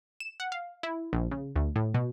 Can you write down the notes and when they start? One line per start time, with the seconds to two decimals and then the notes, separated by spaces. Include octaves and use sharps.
0.20 E7
0.40 F#5
0.52 F5
0.83 E4
1.13 A#1
1.31 C#3
1.56 D2
1.76 A2
1.94 B2